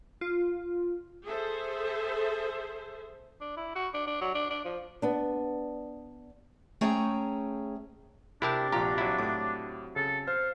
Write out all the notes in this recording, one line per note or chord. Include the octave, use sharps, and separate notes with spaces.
F4
G#4 A4 C5 E5
D4
E4
F#4
D4
D4
F#3
D4
D4
F3
B3 D4
A3 C#4 G#4 C#5 G5 A#5
C3 D4 E4 G4 A#4 A5
A#1 F4 G4 A#5
F#3 E4
A2 D6
C#3 A4
C5 F5